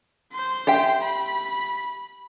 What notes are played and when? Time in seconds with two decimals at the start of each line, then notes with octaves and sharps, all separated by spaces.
0.32 C5 C6
0.67 G4 E5 G5
1.01 B5